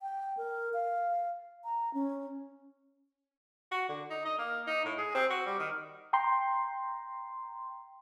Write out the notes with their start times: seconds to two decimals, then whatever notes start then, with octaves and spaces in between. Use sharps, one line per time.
0.02 G5
0.37 A#4
0.74 F5
1.65 A#5
1.94 C#4
3.72 F#4
3.89 D3
4.10 D#4
4.25 D#5
4.38 A#3
4.67 D#4
4.85 A2
4.98 G#4
5.15 C4
5.31 F#4
5.46 G3
5.60 D#3
6.13 G5 A#5 C6